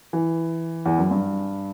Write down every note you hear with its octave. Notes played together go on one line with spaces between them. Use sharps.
E3
E2
F#2
G2